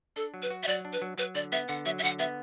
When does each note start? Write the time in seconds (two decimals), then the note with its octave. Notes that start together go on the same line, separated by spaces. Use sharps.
0.16 D4 A4
0.34 F#3
0.42 B4
0.50 F#4
0.63 E5
0.67 F#3 D5
0.85 D4
0.93 B4
1.02 F#3
1.18 F#3 B4
1.35 D3 D5
1.52 B3 E5
1.68 D3 F#5
1.86 F#3 E5
1.99 E5
2.03 D3 F#5
2.19 B3 E5